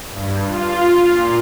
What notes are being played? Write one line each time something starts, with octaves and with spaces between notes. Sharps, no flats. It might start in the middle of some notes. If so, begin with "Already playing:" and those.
G2
F4
A#2